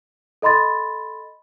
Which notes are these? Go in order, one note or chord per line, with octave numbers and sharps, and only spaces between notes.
A4 D#5 B5 C6 A6